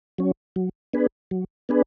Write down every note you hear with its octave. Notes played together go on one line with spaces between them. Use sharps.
F#3 C#4
F#3
B3 D4 G#4 B4
F#3
B3 D4 G#4 B4